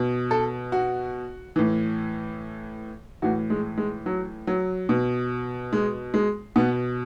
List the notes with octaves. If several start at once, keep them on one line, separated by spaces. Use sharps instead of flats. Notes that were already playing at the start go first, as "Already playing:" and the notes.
Already playing: B2
A4
F#4
A2 E3
A2 E3 F#4
G#3
G#3
F#3
F#3
B2
G#3
G#3
B2 B3